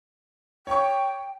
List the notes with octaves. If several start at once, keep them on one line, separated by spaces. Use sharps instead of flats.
C#5 G5 C#6